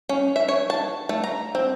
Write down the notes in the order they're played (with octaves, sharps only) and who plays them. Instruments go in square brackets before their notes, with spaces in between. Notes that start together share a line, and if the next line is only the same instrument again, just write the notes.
[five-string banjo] C#4
E5
C#5
A5
A3
A#5
C4